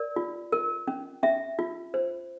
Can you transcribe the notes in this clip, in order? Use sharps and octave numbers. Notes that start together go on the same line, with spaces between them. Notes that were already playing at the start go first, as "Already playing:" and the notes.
Already playing: A#4 D5
F4
A#4
C#4
C#4 E5
F4
C5